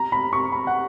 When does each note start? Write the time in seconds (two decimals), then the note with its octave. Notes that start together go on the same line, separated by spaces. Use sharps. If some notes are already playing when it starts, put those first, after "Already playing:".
Already playing: A#5
0.12 B5
0.33 C#6
0.52 B5
0.67 F#5